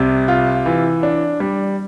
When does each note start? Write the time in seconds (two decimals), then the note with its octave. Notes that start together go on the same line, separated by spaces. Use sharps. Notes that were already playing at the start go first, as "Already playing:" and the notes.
Already playing: C2 C3
0.28 F4
0.66 E3
1.03 D4
1.40 G3